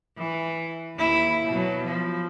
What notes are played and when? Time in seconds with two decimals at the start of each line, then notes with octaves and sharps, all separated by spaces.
0.17 E3
0.97 D#2 E4
1.48 B2 F#3
1.84 F3